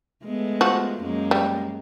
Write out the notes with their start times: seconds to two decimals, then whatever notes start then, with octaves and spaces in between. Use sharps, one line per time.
0.24 G#3 A3 B3
0.61 F3 F#4
1.01 F#2 G#3 A#3
1.31 G3